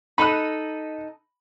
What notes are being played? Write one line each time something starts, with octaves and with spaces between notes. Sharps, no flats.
D#4 A4 D#5 B5 F#6